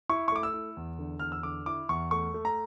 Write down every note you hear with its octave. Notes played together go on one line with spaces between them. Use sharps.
E4 C#6
C#6
A3 D6
E6
E4
E2
D3
E2 F6
E6
D3 D6
E4 D6
E2 C#6
A3 C#6
A3
A#5